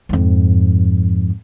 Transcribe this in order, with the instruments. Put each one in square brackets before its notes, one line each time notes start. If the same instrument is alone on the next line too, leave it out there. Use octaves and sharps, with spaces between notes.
[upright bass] F2 G#2